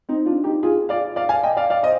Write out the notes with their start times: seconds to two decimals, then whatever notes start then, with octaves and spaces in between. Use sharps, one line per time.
0.09 C4 D#4
0.26 D4 F4
0.44 D#4 G4
0.63 F4 G#4
0.89 D5 F5
1.16 D5 F5
1.29 F5 G#5
1.43 D#5 G5
1.57 D5 F5
1.70 D5 F5
1.83 C5 D#5